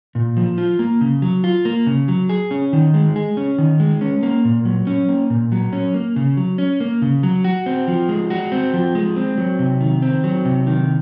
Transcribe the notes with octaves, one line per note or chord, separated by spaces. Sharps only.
A#2
F3
F4
A#3
C#3
F#3
F4
A#3
C#3
F#3
G#4
C#4
D#3
G#3
G#4
C#4
D#3
G#3
C#4
A#3
A#2
F#3
C#4
A#3
A#2
F#3
C#4
A#3
C#3
F#3
C#4
A#3
C#3
F#3
F#4
C4
F3
G#3
F#4
C4
F3
G#3
C4
F#3
C3
D#3
C4
F#3
C3
D#3